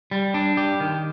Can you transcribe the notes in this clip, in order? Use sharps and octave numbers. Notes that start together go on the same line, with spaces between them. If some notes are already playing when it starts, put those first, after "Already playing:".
G3
D4
G4
D#3